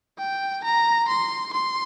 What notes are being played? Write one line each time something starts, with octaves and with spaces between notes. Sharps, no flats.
G5
A#5
C6
C6